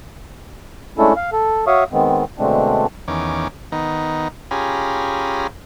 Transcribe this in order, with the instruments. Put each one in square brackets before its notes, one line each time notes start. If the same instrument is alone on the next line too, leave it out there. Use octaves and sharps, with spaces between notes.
[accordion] G#3 A3 C#4 D4 E4 A4
F5
A4
F#4 C#5 E5 F5 C#6 D#6
D#3 G#3 B3 C4
B2 D3 G#3 A3 C4 D4
[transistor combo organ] E2 D#3 C#4 D6
D#3 B3 D#4
C#4 F4 G4 G#4 A#5 B5